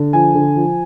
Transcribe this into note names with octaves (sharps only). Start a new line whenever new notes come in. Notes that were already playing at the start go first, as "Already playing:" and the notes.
Already playing: D3
F3 G#5
D3
F3